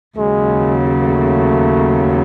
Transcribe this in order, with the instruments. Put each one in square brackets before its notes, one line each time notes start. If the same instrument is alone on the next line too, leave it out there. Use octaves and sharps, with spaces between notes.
[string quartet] D#2 C#3 F#3 [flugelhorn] G#3
[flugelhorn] A3